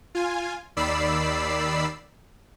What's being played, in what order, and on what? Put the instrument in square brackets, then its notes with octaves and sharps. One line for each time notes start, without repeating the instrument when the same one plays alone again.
[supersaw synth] F4 G#5
D#2 D#3 D5 B5 E6 C7